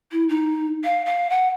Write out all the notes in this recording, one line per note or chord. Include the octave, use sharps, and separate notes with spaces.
E4
D#4
F5
F5
F#5